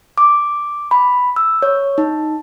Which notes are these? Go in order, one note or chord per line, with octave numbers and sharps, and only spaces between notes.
D6
B5
E6
C#5
D#4